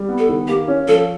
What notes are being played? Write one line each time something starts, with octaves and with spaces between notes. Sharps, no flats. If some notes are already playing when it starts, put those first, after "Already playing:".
Already playing: G3
B3
A4
D#3
A#3 G4
C#4
F3 A4